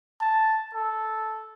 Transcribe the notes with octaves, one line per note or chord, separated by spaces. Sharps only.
A5
A4